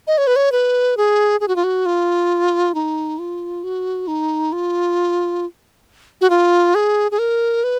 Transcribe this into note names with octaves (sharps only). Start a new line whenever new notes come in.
D#5
C#5
B4
C#5
B4
G#4
G#4
F#4
F4
F#4
F4
D#4
F4
F#4
D#4
F4
F#4
F4
G#4
G#4
A#4
B4